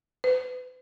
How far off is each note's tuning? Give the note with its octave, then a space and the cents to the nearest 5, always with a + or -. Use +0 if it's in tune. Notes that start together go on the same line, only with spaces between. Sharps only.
B4 +45